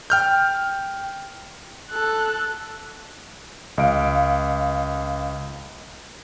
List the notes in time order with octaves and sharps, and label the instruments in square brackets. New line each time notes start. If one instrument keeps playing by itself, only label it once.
[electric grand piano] G5 F6 G6
[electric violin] A4 F#6
[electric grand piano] C#2 D#5 F5 D7